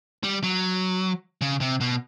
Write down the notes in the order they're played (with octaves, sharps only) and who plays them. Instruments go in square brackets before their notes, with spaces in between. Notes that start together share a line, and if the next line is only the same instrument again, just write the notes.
[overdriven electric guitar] G3
F#3
C#3
C3
B2